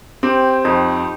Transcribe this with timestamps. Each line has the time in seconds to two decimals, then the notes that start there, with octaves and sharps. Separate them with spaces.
0.23 C4 G4
0.65 F2 D#4